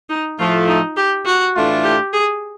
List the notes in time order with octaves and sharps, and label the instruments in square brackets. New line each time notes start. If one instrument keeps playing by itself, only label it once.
[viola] D#4
[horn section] A2 F3 A3 [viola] F4
[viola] D#4
G4
F#4
[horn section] A2 E3 A3 D4 F4
[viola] G4
G#4